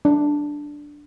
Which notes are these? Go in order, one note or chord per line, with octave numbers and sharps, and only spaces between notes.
D4